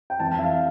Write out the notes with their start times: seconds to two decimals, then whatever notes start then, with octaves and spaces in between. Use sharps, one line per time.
0.10 G5
0.20 F2 E3 A5
0.31 A5
0.39 E5
0.44 F5